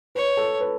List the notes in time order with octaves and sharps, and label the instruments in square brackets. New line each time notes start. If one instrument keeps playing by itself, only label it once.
[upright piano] B4 [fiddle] C#5
[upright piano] A4
B4